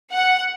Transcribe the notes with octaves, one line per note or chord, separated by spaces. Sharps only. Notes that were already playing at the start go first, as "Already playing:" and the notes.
F#5